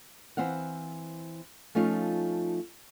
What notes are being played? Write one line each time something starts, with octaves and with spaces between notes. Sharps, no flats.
E3 C4 F5 F#5
F3 A3 C#4 D#4 F4